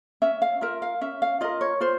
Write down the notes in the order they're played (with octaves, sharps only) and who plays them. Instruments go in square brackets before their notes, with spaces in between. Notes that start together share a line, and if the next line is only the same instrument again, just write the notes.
[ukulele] C#4 E5
F5
F4 A#4 E5
F5
C#4 E5
F5
F4 A#4 D#5
C#5
F4 C5